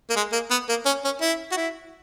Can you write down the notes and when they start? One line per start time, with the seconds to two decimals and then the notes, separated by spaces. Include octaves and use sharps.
0.10 A#3
0.16 G#3
0.32 A#3
0.51 B3
0.69 A#3
0.86 C#4
1.04 C#4
1.21 E4
1.51 F#4
1.57 E4